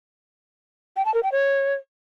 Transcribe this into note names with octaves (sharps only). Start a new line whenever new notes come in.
G5
A5
A#4
G5
C#5